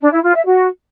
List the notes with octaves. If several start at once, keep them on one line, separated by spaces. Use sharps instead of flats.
D4
E4
F4
E5
F#4